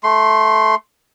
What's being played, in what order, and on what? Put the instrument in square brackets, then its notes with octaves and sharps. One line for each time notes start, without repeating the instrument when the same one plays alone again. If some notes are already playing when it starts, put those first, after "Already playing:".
[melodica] A3 C6